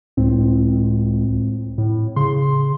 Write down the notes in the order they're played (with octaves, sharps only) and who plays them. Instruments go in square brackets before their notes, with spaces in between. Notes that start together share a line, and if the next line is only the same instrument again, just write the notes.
[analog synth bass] C#2 [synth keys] A2 C4
[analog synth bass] A2
[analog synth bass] C#3 [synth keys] C6